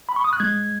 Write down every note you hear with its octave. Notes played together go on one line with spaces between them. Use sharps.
B5
C#6
D#6
F#6
G#3 G#6